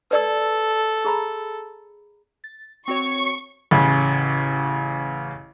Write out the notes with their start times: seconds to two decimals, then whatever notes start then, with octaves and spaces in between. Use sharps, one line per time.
0.11 A4 B4 D5 E6
1.05 G#4 A#5 B5
2.44 A6
2.88 C4 F#4 C#5 C#6
3.71 A1 C#3